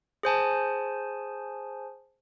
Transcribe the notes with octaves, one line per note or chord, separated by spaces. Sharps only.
G#4 C5 G#5 A5